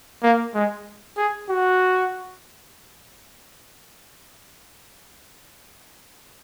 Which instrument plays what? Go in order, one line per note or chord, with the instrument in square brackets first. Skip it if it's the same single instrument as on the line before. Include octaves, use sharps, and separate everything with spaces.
[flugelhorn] A#3
G#3
G#4
F#4